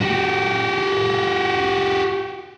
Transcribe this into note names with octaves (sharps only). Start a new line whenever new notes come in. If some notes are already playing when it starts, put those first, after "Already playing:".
F#4 G4